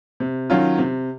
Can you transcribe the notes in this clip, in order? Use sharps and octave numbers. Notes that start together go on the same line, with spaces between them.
C3
D#3 F#3 C#4 F4
C3